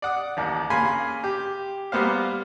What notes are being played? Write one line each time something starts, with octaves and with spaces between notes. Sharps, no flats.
D5 F#5 D#6
A1 D#2
C#3 A#3 G#5 B5 C6
G4
G3 A#3 B3 C5 F5